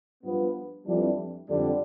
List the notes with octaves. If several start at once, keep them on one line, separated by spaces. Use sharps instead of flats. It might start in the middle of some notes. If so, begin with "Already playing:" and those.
G2 F3 B3
F2 E3 G3 D4
F2 D3 G3 D4